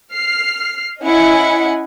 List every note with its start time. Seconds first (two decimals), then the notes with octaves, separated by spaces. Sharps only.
0.12 F6 C7
1.03 C#4 E4 D#5 F#5 G#5 C#7